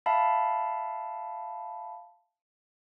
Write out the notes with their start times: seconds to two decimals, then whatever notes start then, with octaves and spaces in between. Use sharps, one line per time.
0.06 E5 F5 A5 B5